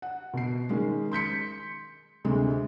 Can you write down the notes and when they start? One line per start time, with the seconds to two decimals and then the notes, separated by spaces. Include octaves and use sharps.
0.02 F#5
0.33 B2 C7
0.69 D#3 G#3 C#4
1.11 C6 G6 B6 C#7
2.24 D2 C3 G#3